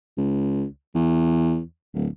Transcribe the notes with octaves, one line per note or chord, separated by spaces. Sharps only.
C#2
E2
D1